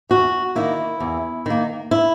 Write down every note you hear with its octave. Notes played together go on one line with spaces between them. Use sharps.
E2 F#4
D#3 A#3 E4
E2
D#3 A#3
E4